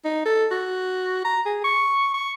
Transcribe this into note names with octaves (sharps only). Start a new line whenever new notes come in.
D#4
A4
F#4
A#5
G#4
C#6
C#6